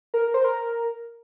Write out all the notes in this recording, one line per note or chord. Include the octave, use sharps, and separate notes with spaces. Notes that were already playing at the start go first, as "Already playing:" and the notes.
A#4
A#4
C5
A#4